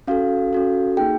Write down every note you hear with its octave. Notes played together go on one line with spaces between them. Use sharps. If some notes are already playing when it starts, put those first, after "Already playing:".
C#4 F#4 A4 F5
C#4 F#4 A4
A#3 D#4 G#4 G5